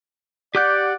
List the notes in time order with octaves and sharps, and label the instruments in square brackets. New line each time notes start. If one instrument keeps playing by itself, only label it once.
[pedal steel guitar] G4 D6 G6 [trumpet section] D5 F#5